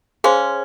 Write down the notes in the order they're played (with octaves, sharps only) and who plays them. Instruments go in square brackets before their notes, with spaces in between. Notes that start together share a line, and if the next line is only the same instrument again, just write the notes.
[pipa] C#4 [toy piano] G#4 C5 F5 C6